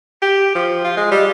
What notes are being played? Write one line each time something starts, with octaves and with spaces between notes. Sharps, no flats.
G4
F3
F4
G#3
G3